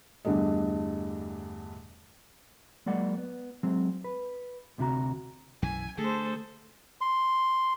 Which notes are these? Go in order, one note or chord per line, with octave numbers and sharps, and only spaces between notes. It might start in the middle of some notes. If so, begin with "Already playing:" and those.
E2 G2 D3 G3 A3 D#5
F#3 G#3 A#3 D5 F#5
B3
F#3 G#3 C4
B4
D2 C3 E4 F#4 A#5
B1 F#2 E3 G#5
D3 A3 G#4 A4 C5
C6